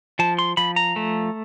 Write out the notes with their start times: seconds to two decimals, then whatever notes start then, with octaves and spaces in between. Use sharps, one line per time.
0.19 F3 A5
0.39 C6
0.57 F3 B5
0.76 A#5
0.96 A3